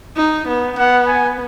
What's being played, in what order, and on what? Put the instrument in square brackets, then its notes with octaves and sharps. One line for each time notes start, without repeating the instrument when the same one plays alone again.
[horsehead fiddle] D#4
B3
[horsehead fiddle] B3 [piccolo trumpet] F#5
[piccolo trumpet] G#5